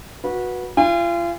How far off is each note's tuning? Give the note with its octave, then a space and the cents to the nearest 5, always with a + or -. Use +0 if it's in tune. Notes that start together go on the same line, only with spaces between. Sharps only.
F#4 -15 B4 -20
F4 -35 G#5 -45